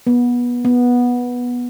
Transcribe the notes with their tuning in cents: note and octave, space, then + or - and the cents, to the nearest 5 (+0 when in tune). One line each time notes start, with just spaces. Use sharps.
B3 -25
B3 -10